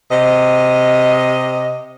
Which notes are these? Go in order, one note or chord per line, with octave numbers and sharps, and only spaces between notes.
C3 D#5